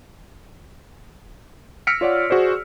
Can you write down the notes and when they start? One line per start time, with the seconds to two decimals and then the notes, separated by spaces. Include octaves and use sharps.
1.87 E6 F6 A#6 B6 C#7 D7
2.01 F4 C#5 D5 F#5
2.30 F#4 G#4 C5 D5